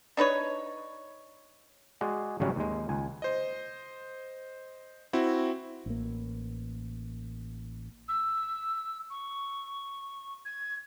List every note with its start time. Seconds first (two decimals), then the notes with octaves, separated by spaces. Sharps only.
0.17 D4 D#4 B4 C#5
2.01 G#3 F#4 G#4 D5
2.40 G#1 C#3 F#3 G3 C#4 F#4
2.56 D#2 G#3
2.89 C#2 G#5
3.22 C5 D#5
5.13 C4 E4 F#4
5.86 A1 A#3
8.09 E6
9.10 C#6
10.45 G#6